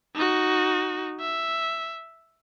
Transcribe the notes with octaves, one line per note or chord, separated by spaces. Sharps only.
D#4 F#4
E5